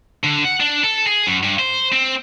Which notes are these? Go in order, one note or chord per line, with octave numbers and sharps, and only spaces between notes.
D3
F#5
D4
A4
G#4
F#2
G2
C5
C4